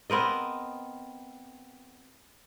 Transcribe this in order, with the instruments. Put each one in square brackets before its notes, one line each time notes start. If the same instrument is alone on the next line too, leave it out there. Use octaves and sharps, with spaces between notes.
[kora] B3 C4 A#4 D#5